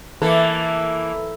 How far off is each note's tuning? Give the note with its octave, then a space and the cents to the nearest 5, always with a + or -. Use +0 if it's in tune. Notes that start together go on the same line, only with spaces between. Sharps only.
E3 +0 A#3 +0 A4 +0